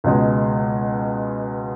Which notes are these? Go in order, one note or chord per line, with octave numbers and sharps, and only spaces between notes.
C#2 B2 G#3